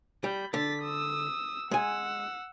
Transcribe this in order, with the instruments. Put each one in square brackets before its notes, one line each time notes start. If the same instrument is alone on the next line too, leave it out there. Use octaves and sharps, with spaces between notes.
[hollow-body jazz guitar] G3 [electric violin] B5 G6
[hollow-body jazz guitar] D3 [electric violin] A6 B6
[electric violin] D#6 E6
[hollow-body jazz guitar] G#3 G#5 [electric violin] F#5 E6